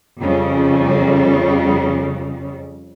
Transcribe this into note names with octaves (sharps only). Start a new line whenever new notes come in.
F2 C#3 G3